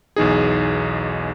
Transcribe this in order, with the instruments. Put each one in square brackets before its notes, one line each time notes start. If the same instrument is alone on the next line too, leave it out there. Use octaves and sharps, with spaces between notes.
[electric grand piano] B1 E2 D#4 G#4